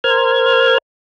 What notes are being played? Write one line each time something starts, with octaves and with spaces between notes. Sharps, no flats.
A#4 C5 F6 G#6